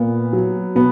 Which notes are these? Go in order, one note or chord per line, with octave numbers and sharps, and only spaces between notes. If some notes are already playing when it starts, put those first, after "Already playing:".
Already playing: A#2 B3
F#3
B2 B3